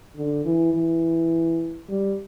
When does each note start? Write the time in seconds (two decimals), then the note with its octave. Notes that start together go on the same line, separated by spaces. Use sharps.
0.16 D3
0.45 E3
0.74 E3
1.89 G3